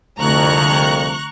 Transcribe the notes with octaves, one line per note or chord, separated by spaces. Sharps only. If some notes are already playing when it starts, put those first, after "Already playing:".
C2 F2 D3 A3 A#5 C#6 F#6